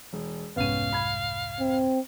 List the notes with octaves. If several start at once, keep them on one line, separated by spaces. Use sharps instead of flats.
E1
F1 C2 G#2 B3 C#4 F5 D#7
B5 G#6
C4